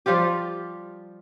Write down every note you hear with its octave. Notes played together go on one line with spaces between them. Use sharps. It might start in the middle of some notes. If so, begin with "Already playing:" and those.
F3 G3 F4 G4